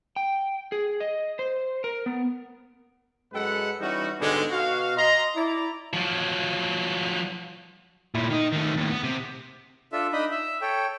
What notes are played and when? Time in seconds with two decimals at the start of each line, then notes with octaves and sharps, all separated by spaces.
0.16 G5
0.72 G#4
1.00 D#5
1.39 C5
1.84 A#4
2.06 B3
3.33 F#2 G#3 A4 B4 F#5
3.80 E3 G3 C#4 D#4 E4 F#4
4.20 G#2 B2 D3 G3 G#3
4.50 B2 F#4 F5
4.96 D#5 A#5 C6
5.36 E4 D5 A#5
5.93 F3 F#3
8.15 A#2 E4
8.30 D#3 D#4
8.52 D#3 A3
8.77 D#2 A2
8.91 B3
9.03 C3
9.92 D4 F4 A4 E5
10.13 D4 D#4 D#5 B5
10.31 E5
10.61 A4 C#5 G5